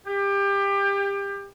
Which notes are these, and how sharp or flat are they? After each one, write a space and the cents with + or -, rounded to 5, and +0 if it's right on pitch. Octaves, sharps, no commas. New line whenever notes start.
G4 +25